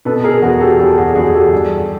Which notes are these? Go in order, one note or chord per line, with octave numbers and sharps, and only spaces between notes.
B2 A4 B4
G#4 A#4
E2 F#4 G#4
G4 A4
E2 G4 A4
F#4 G#4
E2 F#4 G#4
G4 A4
G2